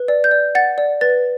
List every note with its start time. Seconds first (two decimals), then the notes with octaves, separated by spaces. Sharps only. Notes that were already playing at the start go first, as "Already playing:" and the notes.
Already playing: B4
0.08 D5
0.24 G6
0.31 D5
0.55 F#5 A6
0.78 D5
1.01 B4 A6